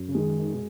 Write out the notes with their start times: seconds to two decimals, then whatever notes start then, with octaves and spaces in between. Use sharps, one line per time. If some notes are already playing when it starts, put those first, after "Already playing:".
Already playing: F#2
0.08 C#3
0.14 D#3 G#3
0.54 B2